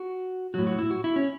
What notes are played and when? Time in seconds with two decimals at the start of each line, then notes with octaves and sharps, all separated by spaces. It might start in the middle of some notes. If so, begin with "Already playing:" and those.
Already playing: F#4
0.54 A2 F#3 F#4
0.67 F#4
0.79 E4
0.91 F#4
1.04 E4
1.16 C#4